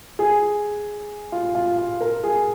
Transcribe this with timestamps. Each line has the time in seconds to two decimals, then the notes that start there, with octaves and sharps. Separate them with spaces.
0.19 G#4
1.32 F4
1.55 F4
1.78 F4
2.01 A#4
2.24 G#4